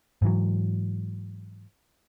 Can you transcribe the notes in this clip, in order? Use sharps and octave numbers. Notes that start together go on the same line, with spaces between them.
G#2 E3 F#3